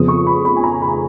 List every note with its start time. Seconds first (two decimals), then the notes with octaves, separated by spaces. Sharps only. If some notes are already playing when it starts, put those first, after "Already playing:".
Already playing: F2 C#3 F3 B3 D#6
0.08 C#6
0.27 B5
0.45 B5
0.56 G#5
0.64 A#5
0.82 B5